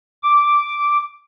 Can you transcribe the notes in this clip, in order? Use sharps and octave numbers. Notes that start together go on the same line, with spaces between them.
D6